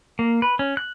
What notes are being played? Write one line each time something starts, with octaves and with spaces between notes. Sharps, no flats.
A#3
B4
C#4
F#6